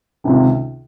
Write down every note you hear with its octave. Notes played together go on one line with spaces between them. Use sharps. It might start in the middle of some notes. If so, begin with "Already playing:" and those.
C#2 C3 D#3